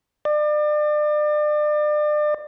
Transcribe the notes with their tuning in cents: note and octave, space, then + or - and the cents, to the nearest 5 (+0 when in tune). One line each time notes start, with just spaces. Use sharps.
D5 +35